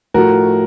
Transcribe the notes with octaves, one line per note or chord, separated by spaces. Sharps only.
A2 F3 A3 F#4 A#4